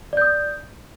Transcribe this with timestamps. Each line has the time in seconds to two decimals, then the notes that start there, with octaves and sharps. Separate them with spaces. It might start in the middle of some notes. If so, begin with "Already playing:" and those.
0.13 D5
0.17 G6
0.22 D#6